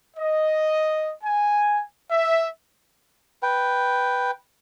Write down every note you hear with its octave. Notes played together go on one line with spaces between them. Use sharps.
D#5
G#5
E5
B4 G5